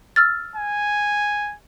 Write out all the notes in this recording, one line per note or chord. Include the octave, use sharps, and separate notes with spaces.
E6 F6 A6
G#5